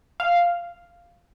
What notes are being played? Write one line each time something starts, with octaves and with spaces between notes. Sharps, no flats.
F5